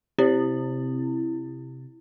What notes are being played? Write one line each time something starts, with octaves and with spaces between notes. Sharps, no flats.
C3 E4